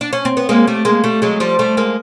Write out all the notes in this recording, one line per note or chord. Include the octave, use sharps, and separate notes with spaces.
D4
C#4
C4
B3
G#3 A#3
G3 A3
G#3 A#3
G3 A3
F#3 G#3
F3 G3
G3 A3
G#3 A#3